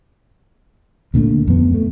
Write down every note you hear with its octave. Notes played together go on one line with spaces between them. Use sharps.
D2 A#2 D3 A3
F2 B3
A3